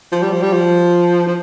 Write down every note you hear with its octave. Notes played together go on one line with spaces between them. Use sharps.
F3
G3
F3
G3
F3
F3